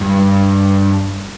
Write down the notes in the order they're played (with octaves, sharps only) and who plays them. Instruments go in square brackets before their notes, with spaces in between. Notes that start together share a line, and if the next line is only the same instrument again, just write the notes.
[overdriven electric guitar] G2